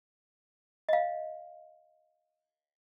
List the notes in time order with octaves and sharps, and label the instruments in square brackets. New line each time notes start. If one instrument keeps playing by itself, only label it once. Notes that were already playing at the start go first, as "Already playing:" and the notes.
[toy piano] D#5 F5